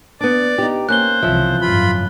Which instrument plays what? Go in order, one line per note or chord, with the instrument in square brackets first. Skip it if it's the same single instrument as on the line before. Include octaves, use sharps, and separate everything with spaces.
[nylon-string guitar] B3 D4 [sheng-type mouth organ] D5 D6
[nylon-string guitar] D#4 G4
[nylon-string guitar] A#3 C#4 [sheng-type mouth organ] C5 [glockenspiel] F#6 G7
[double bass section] C2 E3 C4 [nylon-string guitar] C#3 F3 E5
[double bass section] G#1 F#2 [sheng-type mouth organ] F4 B5